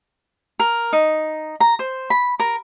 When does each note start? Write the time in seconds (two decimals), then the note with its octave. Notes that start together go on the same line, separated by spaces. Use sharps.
0.59 A#4
0.93 D#4
1.60 A#5
1.79 C5
2.10 B5
2.40 A#4